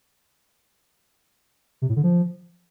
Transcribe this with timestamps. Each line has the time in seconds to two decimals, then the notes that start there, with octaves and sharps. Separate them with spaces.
1.82 C3
1.89 A2
1.96 D3
2.04 F3